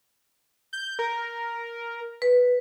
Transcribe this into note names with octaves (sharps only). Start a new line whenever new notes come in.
G6
A#4
B4